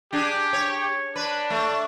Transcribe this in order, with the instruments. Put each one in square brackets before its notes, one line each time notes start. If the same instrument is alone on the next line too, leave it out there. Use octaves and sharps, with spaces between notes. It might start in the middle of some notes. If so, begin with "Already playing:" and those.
[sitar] D4 G#4 [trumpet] G4
[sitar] C#5
[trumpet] D4 [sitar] B4
[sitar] A3